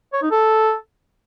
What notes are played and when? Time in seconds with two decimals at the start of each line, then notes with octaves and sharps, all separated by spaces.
0.13 C#5
0.22 D#4
0.31 A4